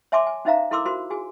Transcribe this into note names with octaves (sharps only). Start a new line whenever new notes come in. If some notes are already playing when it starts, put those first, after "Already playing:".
C#5 E5 G#5 A5 C6 D6
G#5
C#4 D#4 C5 E5 F5 A#5
E4 A4 A#4 C6 D6 E6
F4 F#4 A#4 C5 C6
F#4 G#4 G#5